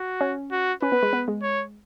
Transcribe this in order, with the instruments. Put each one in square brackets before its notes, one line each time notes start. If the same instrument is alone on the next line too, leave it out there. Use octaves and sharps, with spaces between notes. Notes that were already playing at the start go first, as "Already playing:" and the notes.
Already playing: [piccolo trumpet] F#4
[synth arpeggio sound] C#4
[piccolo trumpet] F#4
[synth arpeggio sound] C#4 [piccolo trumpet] B4
[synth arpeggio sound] B3
G#3
B3
G#3
[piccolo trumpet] C#5